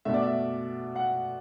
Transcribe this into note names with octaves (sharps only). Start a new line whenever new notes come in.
B2 A3 D4 E5
D5
E5
F#5